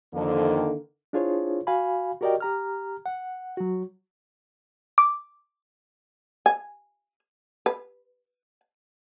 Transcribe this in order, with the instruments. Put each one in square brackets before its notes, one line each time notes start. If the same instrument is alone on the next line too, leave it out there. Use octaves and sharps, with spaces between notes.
[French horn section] F2 [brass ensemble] D3 D#3 A#3
[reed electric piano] D4 E4 F4 G#4 C5 C#5
F#4 F5 G#5 B5
F#4 G4 A#4 D5 D#5 G5
G4 A#5 F6
F#5
F#3 F#4
[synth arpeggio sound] D6
[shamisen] G#5
B4